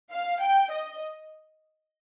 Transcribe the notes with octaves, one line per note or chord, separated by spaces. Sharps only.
F5
G5
D#5